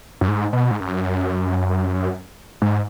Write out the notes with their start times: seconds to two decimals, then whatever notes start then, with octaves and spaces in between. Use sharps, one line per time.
0.21 F#2
0.28 G#2
0.53 B2
0.71 G#2
0.80 F#2
2.62 G#2